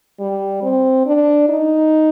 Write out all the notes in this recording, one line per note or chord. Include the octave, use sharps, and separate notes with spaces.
G3
C4
D4
D#4